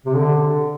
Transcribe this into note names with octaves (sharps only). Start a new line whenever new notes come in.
C3
D3